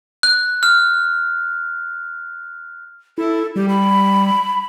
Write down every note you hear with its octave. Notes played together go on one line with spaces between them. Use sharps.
F#6
F6
E4 A4
G3 G4
B5